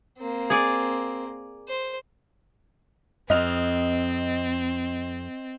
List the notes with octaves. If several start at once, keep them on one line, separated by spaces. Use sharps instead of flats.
A#3 C4
G#4 D5
C5
F2 C4 D#5 F7